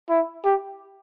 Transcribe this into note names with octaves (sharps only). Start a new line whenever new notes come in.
E4
G4